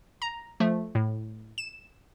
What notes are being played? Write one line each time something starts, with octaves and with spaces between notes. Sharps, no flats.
A#5
F3 A3
A2
E7